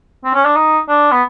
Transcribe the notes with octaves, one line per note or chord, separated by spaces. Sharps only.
C4
C#4
D4
D#4
D4
B3